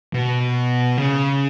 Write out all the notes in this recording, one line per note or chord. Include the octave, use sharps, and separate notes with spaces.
B2
C#3